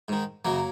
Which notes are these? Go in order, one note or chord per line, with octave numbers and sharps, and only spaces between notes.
G#2 D#3
F#2 C#3 F#3 A#3